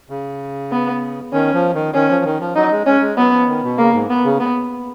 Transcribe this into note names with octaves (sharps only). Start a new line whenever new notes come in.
C#3
B3
D#3 C#4
F3
D#3
D#3 C#4
F3
D#3
F3
F#3 D#4
G#3
G#3 C#4
G#3
F#3 B3
F3
D#3
B2
C#3 A#3
G#2
B3
C#3
B3